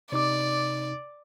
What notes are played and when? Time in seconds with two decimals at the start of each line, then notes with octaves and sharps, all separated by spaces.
0.12 C3 D#4 D5 D6